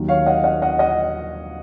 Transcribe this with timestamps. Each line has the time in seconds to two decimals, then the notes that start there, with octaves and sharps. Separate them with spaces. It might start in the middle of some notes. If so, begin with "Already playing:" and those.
Already playing: D#2 D#3 F#3
0.09 C#5 F5
0.26 D#5 F#5
0.44 D#5 F#5
0.62 D#5 F#5
0.79 D#5 F#5